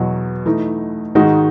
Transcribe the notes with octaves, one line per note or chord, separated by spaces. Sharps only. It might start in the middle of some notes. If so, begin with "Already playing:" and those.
Already playing: E2 B2 F#3
E3 A3 D#4
G#2 D#3 G#3 D#4 F#4